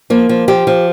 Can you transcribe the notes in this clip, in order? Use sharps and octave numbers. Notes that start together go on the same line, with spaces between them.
F3 A#3
F3
F3 G4
F3